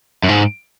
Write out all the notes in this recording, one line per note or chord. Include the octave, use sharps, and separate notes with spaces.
F#2
G#2